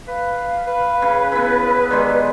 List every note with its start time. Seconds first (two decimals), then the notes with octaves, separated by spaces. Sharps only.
0.08 B4 F5
0.67 B4
1.02 C#3
1.32 B3 E4
1.91 D#3 G#3 G4 D5